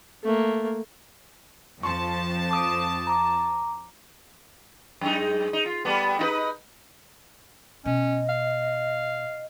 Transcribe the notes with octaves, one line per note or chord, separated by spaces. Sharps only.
A3 A#3
F2 F3 A5 C6 C#6
D6 D#6 D7
A#5 D6
F#2 G#3 D#4
D#4
F4
G3 A3 B3
D#4 F4 B4
B2 C#4 D#5
F5